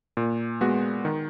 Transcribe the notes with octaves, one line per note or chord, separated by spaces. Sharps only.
A#2
G#3 B3 F#4
D#3